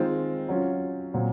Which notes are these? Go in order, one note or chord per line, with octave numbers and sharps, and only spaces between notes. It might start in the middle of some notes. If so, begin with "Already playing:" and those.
Already playing: D#3 G#3 C4 F4
F#3 C#4 F4
A#2 F#3 C4